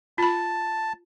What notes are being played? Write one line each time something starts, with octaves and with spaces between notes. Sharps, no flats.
F4 A5 B5